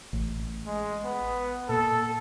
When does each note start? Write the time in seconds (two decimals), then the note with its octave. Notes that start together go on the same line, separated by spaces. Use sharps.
0.13 A1
0.66 G#3
1.04 B3
1.69 A#2 A4